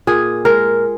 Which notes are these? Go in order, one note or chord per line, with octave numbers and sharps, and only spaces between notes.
A#2 G#4
G#3 A#4